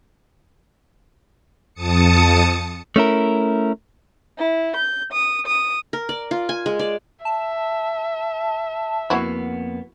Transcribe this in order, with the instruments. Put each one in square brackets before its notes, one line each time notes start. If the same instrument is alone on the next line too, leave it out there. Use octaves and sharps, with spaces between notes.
[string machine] F2 A5 D#6 C#7
[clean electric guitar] A3 C#4 E4 A#4
[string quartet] E4
G6
D#6
D#6
[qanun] A#4
D5
F4
G#5
G#3
D5
[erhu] E5 [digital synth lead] A5
[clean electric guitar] F2 A#3 B3 [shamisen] E4 F#4